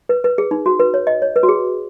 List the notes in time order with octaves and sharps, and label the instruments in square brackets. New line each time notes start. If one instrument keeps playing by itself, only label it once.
[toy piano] B4
B4
G#4
D#4
F#4
B4
C#5
D#5
C#5
B4
F#4
G#4